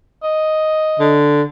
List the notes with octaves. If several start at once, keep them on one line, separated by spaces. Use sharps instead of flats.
D#5
D3